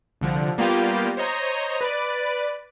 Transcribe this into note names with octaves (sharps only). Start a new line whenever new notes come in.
C2 D3 F3
G3 A#3 B3 F4 G4
C5 C#5 D#5 A#5
B4 D5